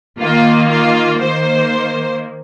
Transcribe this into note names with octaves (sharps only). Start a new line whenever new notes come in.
D#3 A#3 F4
F4
D#3 A#3 C5